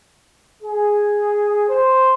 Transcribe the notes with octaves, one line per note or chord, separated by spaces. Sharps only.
G#4
C5